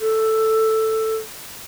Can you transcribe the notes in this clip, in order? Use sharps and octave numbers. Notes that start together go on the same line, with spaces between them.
A4